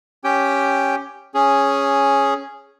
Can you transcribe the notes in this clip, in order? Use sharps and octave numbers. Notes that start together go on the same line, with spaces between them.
C#4 G4 G5
C#4 G#4